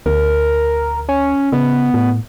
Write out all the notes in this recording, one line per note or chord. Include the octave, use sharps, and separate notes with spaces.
D2 A#4
C#4
C#3 B3
A2